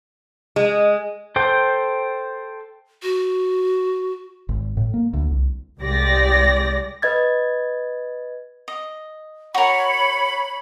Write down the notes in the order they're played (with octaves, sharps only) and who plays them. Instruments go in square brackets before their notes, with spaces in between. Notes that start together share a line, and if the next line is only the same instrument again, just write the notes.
[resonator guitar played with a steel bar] G#3
[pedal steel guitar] A4 C5 G5
[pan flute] F#4
[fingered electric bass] G#1
A2
A#3
D2
C2
[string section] C2 G#3 G4 D5 A#6
[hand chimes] B4 D#5 G#6 A6
[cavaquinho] D#5
[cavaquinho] F#4 A#4 [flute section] C#5 B5